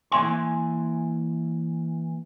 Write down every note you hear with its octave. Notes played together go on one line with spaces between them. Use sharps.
E3 A#3 E5 G#5 C6